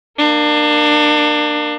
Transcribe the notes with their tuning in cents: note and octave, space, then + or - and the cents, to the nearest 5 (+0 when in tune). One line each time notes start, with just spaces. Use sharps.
A#3 +0 D4 +25